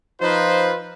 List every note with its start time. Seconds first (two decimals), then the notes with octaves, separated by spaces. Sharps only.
0.21 F3 D#4 F4 B4 C5